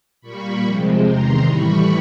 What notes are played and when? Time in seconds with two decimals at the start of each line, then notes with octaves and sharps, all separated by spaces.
0.21 A#2 G3 A#3 B5 C#6
0.63 C3 F3 G#3 C4
1.04 E2 C3 D#3 A#5 C6
1.45 A2 E3 G3 B5 C#6